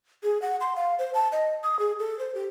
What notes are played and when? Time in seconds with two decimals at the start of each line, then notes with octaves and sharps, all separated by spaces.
0.23 G#4
0.42 F#5
0.61 C6
0.76 F5
0.99 C5
1.14 A5
1.32 D#5
1.64 D#6
1.79 G#4
1.99 A4
2.19 C5
2.35 G4